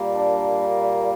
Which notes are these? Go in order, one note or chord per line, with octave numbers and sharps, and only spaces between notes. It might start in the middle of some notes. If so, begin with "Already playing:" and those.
Already playing: A#2 G3 A#3
D4